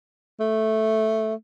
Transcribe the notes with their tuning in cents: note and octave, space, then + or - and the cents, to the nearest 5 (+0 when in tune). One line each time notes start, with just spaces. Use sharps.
A3 -5